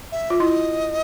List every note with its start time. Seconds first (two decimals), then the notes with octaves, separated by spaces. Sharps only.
0.12 E5
0.30 F4
0.40 E4 D#5